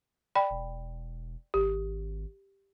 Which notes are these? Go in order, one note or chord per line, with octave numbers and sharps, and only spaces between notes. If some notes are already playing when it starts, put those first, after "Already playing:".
D5 G5 B5
E1
G#1 G4